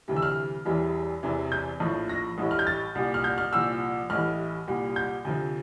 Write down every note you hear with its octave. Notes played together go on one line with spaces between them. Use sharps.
D2 C3 E3 G3
E6
F6
E1 E2 E3 G3
E1 E2 C3 E3
G6
A#1 A2 F3
A#6
A1 A2 G3
F6
G6
A6
C2 A#2 G3
F6
G6
F6
C2 A#2 F3 E6
A1 A2 E3 G3 F6
C2 A#2 G3
G6
D2 C3 F3